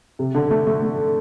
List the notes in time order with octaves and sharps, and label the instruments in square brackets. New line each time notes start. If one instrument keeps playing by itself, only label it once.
[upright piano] C3
D3
A3
A3
A3